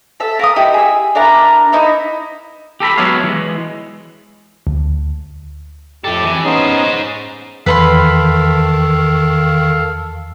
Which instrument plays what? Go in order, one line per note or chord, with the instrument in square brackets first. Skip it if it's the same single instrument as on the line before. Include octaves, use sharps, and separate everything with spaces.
[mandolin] A4 E5
A#4 F5 C#6 D#6
D#4 E4 G4
G#4 E6
D4 E4 A#4 A#5
D#4 E4 E5 A#5
[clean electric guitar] G4 A4 A#5 B5
F#3 G#3 B3 E4 C#5 F5
E3 G#3
[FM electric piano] D2
[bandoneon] F2 G4 [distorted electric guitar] E4 A4
[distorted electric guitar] E3
[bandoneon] B3 C#4 D#4 [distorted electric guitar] G#4 C5
[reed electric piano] E2 [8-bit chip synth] D#3 [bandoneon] A4 F5 [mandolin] B4 B5 C6